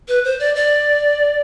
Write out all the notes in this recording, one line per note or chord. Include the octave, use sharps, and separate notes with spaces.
B4
C5
D5
D5